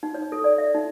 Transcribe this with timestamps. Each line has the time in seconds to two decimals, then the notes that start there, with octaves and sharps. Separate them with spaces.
0.03 D#4
0.14 C#5
0.32 A4
0.44 D5
0.58 E5
0.74 D#4